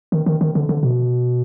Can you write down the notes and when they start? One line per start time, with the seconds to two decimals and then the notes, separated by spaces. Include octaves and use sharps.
0.12 D#3
0.26 D#3
0.41 D#3
0.55 D3
0.69 D3
0.83 B2